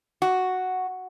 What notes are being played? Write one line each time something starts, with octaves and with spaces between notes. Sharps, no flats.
F#4